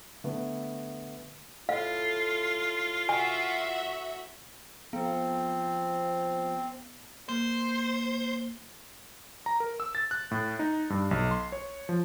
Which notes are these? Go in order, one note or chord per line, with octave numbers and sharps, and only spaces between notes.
D3 A3 B3
A2 F4 F5
F#4 E5 G#5
F3 B3 C4
A#3 C5
A#5
A#4
E6
A6
F#6
A2
D#4
G2
B1
C6
C#5
F3